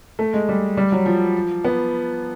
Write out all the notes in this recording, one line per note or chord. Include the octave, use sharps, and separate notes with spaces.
A3
G#3
G3
G3
F#3
F3
B3